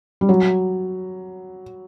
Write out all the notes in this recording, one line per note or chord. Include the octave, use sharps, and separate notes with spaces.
G3
F#3